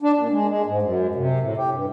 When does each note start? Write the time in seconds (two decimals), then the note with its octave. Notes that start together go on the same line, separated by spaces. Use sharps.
0.02 D4
0.17 A#2
0.31 G#3
0.48 G#3
0.66 G#2
0.82 F#2
1.15 C3
1.40 A2
1.57 G4
1.72 G2